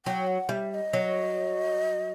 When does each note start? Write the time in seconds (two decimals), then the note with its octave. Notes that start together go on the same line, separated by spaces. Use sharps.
0.06 F#3 G5
0.27 F#5
0.49 G3 E5
0.71 E5
0.74 D#5
0.93 F#3